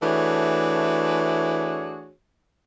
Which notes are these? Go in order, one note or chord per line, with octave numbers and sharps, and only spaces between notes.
E3 A3 D4 F#4 G#4 C#5